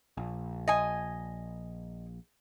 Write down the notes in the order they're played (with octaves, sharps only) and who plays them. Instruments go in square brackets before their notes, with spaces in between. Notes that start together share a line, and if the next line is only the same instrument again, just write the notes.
[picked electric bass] A#1
[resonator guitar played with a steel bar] D#5 G#5